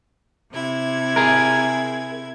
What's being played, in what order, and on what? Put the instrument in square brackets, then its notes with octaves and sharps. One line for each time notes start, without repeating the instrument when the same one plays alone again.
[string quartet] C3 E4 G#6
[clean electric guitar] G#4 A#4